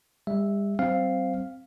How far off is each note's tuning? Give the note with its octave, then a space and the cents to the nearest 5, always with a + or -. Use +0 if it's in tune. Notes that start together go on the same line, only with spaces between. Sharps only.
G3 +40 E5 -5
G3 -40 C4 +0 F5 +0